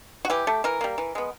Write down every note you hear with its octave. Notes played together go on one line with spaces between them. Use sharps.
F#4
E3 G4
A3
E3 A#4
G3 A#3
E3
G#3 B3